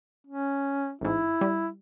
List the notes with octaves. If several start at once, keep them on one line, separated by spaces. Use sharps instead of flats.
C#4
A1 G#2 E4
G3